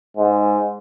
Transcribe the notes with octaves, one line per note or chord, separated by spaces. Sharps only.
G#2